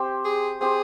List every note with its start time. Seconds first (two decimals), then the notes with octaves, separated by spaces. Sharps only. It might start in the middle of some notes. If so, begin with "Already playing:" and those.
Already playing: C4 G4 C5
0.25 G#4
0.61 C4 G4 G#4 C5